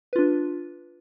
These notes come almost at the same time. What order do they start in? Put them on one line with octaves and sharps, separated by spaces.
B4 F4 D4